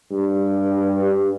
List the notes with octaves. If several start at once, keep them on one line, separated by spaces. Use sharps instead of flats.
G2